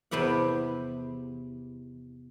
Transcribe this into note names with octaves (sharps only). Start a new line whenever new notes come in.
E2 C3 B3 G4 F#5